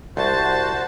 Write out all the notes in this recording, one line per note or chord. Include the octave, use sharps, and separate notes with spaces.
C2 F#4 C5 A5